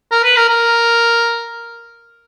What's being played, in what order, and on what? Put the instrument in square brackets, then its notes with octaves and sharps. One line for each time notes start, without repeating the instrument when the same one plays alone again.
[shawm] A#4
B4
A#4
A#4